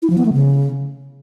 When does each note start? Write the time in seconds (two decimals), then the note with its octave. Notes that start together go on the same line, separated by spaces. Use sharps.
0.02 E4
0.10 F3
0.18 B3
0.25 A3
0.33 C#3